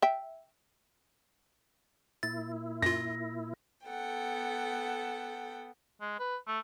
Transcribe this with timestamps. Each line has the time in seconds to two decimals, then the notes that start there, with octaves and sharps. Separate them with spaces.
0.02 E5 G5
2.23 A#2 E4 A6
2.82 F#2 F4 A#6
3.87 B3 A4 F#5 G5
6.01 G#3
6.19 B4
6.47 A3